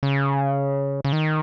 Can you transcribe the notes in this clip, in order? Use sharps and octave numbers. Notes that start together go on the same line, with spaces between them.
C#3
C#3
D#3